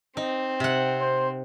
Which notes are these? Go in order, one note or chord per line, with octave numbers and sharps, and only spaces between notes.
C4 D#4
C3 F#5
C5